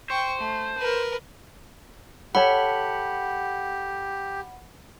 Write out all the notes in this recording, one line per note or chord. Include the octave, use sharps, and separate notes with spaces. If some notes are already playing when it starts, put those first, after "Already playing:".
C5 G5 C#6
A3
A#4 B4
G4 A4 C#5 F#5 A5 B5